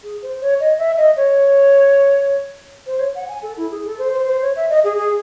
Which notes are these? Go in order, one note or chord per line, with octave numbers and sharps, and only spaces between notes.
G#4
C5
C#5
D#5
E5
D#5
C#5
C5
C#5
F#5
G#5
A4
E4
G#4
A4
C5
C5
C5
C#5
E5
D#5
G#4
G#4